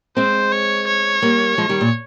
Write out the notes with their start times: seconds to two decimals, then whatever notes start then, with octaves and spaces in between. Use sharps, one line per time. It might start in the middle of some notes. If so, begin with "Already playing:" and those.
0.17 G#3 C4 C5
0.52 C#5
0.87 C#5
1.22 G3 A#3
1.58 F3 G#3
1.69 D#3 G3
1.81 A#2